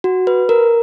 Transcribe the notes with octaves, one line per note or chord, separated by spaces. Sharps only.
F#4
B4
A#4